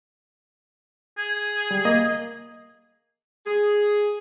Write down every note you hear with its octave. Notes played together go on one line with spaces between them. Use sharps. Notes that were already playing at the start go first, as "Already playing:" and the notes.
G#4
G3
A#3 D#5
G#4